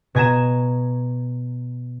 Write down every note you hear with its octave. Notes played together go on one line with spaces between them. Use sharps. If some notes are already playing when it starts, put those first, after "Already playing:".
B2 G#5 A#5 E7